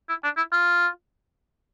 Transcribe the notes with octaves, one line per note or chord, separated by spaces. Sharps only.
E4
D4
E4
F4